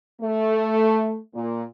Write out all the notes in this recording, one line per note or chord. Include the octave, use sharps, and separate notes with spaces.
A3
A#2